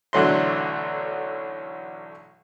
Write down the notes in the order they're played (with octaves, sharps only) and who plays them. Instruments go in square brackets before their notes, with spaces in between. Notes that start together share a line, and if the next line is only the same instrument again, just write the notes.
[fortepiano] B1 D3 E3 F#3 A3 C6